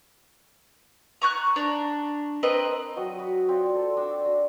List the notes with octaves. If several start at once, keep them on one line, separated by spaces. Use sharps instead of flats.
A#5 C#6 F#6
D4 A#5
C4 A#4 B4 D#5
F#3 F#4 D#5 G5
F#4 B4
C4 F4 D5
A4
D4 F#4 G5 E6
F#4